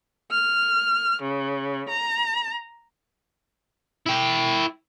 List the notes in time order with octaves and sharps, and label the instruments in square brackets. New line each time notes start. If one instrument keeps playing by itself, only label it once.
[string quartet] F6
C#3
A#5
[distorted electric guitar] E4 G5